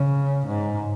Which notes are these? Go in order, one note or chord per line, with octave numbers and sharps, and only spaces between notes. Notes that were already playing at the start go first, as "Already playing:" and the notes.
Already playing: C#3
G#2